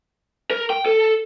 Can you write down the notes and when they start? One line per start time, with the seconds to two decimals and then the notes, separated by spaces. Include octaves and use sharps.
0.50 A#4
0.70 G5
0.86 A4